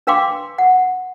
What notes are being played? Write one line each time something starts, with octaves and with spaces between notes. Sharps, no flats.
D4 B4 F5 G5 C6 D6
F#5